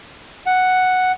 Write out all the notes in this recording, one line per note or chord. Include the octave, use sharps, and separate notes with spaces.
F#5